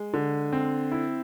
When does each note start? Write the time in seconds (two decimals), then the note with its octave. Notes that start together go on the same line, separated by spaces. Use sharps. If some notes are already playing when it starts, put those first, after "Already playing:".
Already playing: G#3
0.14 D3
0.53 C4
0.92 E4